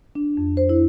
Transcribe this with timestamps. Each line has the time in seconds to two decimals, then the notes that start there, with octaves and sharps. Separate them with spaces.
0.15 D4
0.37 F2
0.57 C5
0.69 E4